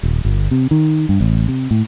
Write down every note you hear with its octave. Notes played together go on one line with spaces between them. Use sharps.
D#1
G1
C3
D#3
G2
A1
C3
A2